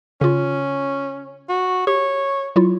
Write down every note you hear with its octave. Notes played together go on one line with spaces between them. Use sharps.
C#3 C#4 F4
F#4
G4 C#5
F#3 E4 F4